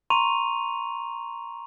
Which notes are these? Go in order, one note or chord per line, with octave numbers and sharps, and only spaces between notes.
A#5 C6 C#6 D#7 F7